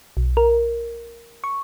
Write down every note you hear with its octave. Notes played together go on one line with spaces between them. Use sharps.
B1
A#4
C#6